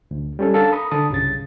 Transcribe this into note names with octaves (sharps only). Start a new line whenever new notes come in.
D2
G3 C#4 A4
D4 A4 A#4 F5 A5
A#5 B5 D#6
D3 A5 D#6
C2 G2 C#3 A6